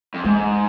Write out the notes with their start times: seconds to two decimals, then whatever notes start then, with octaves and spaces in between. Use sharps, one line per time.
0.14 F2
0.25 G#2 G#3